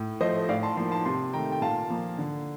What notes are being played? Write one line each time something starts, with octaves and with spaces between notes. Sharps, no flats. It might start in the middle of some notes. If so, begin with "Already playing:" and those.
Already playing: A2
F3 A3 C5 D#5
A2 D5 F5
A5 C6
F3 A#3 A5 C6
A5 C6
C3 A5 C6
D#3 A3 G5 A#5
G5
A#2 F5 A5
F3 A#3
D3